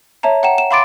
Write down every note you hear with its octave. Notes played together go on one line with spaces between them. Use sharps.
C#5 E5 A5 A#5
F#5 G5 A#5 E7
E7
F5 B5 C6 D6 A6 D7